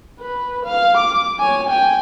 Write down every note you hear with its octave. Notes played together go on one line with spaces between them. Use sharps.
B4
F5
D6
C#5 G#5
G5 G#5